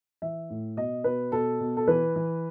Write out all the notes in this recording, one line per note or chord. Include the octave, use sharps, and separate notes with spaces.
E3 E5
A2
B2 D#5
B2 B4
B2 A4
B2
A4
E3 B4
E3